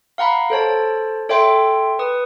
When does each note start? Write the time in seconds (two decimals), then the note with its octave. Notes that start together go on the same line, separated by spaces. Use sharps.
0.18 F5 F#5 A#5 B5
0.50 A4 C5 C#5 A5
1.29 A4 C#5 E5 G5 C6
1.99 B4 D#6